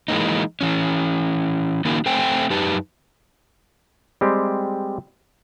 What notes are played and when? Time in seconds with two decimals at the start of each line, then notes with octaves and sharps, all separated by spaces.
0.08 E3 G#3 A#3 D#4
0.61 E3 C#4
1.85 D#3 A#3 C#4 D#4 F#4 A#4
2.06 A3 C4 C5 G5 G#5
2.50 F#2 D#4 G4 B4 A5
4.21 G3 G#3 C4 G4